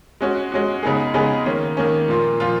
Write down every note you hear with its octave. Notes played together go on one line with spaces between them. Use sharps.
G#3 C#4 F#4
G#3 C#4 F#4
C#3 G#3 B3 D#4 G#4
C#3 G#3 B3 D#4 G#4
D#3 A#3 C#4
D#3 A#3 C#4
A#2 F3 A#3 F4
A#2 F3 A#3 F4